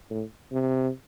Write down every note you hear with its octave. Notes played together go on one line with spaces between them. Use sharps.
A2
C3